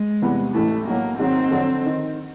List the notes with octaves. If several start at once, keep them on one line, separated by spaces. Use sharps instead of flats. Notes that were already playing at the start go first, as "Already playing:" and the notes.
Already playing: G#3
E2 C3 E3 G3 B3
A1 A2 E3 A3
B1 A2 F#3 A#3
G#2 D#3 F#3 C4
F2 D3 F#3
D#3